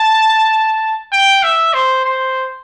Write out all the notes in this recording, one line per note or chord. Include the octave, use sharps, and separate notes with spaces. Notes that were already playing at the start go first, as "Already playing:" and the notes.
Already playing: A5
G5
E5
C5
C5